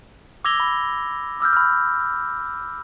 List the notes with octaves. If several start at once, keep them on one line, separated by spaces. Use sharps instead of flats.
D6 E6 G#6 A#6 F7 G7
B5
D6 E6 F6 G6
B5 F6